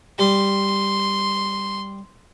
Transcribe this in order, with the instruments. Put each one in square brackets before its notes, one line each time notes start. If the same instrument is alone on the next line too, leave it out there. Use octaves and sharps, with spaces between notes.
[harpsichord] G3 [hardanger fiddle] C6